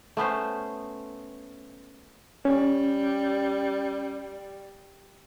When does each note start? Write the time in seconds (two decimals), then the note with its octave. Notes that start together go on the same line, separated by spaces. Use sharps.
0.17 A3 B3 C#4 C5
2.45 G3 C#4